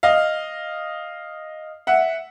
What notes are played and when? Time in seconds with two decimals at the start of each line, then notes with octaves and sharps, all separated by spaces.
0.03 D#5 F5
1.87 E5 F#5